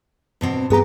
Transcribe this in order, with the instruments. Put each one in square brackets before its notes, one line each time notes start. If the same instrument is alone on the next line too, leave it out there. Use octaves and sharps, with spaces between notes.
[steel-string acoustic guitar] G2 B2 C4
[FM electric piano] G2 G#4 A#5 [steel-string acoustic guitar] B3 G4